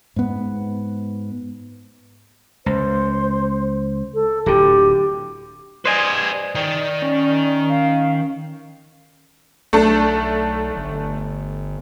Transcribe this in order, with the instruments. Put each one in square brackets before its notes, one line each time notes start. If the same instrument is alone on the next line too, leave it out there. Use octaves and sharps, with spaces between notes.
[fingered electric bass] G#2 B3
[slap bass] C#2 [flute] C5
[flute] A4
[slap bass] D1 D3 [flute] G4
[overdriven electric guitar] B4 D5 [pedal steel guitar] C5 D#5 G#5 [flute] G#6
[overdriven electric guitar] D#3 [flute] D5
[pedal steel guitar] C#4
[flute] F5
[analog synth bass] B1 [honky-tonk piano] A3 D4 A4
[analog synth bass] G1